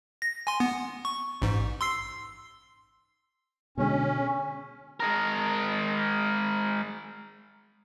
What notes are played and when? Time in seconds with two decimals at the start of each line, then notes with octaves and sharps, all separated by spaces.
0.22 A#6
0.47 G#5 C6
0.60 B3
1.05 C#6
1.42 A1 G#2
1.81 C6 E6 C7
3.78 B2 D3 G#3 C#4
5.00 G#3 A#4